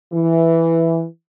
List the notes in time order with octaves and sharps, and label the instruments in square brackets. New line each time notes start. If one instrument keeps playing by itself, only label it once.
[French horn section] E3